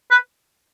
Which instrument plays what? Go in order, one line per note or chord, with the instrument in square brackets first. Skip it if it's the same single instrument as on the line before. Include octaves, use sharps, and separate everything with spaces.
[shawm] B4